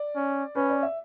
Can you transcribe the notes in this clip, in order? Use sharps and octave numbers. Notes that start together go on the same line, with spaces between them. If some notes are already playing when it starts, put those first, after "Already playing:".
Already playing: D5
C#4
C#4 B4
D5
E5